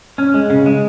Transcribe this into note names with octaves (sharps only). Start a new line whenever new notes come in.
C#4
G#3
C#3
G#3